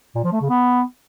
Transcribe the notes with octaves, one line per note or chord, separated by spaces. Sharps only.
A#2
F3
A3
C#3
B3